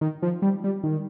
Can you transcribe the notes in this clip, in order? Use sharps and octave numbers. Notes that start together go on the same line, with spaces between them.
D#3
F3
G3
G3
D#3